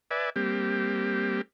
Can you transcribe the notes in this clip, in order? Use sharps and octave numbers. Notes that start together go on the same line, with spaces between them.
B4 D5 E5 G#5
G3 A#3 C4 G4